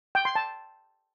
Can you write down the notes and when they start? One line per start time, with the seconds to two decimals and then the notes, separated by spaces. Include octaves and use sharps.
0.15 G5
0.25 C6
0.35 A5